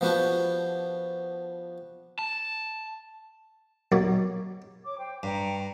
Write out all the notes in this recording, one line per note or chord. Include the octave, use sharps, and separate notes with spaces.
F3 B3 D4 F#4 G4
A5
B2 F#3 A#3 B3 D#4 D5
C#5 D6
C5 G5
G2 G5 A#5 C#6